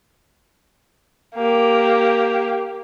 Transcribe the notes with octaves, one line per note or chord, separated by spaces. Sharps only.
A#3 G4